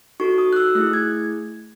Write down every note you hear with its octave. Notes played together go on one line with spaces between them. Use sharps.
D#4 F#4 A4 C#6
D#6
F#6
E6
A3 E4 G#4 F#6
G#6